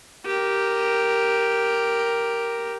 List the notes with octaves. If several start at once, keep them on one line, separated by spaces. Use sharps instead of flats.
G4 A#4